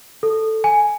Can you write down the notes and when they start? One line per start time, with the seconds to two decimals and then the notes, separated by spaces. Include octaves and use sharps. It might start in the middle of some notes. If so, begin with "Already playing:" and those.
0.23 A4
0.64 G#5